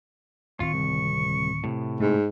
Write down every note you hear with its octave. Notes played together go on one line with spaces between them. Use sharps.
D1 D#3 C4 F4 C#6
C2
A2 C3
G#2 A3